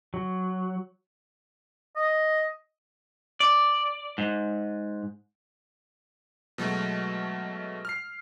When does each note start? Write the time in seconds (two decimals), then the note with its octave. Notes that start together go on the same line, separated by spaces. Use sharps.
0.14 F#3
1.96 D#5
3.40 D5
4.18 G#2
6.58 B2 F#3 G#3 A3
7.85 F6 C7